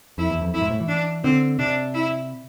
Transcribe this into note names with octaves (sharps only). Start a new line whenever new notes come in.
F2 E4
E2
F2
F2 E4
G#2
A2
E3
D4
D3 C4
C3 D4
E4